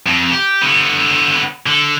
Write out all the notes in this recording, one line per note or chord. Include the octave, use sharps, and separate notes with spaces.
F2
G4
D3 B3
D3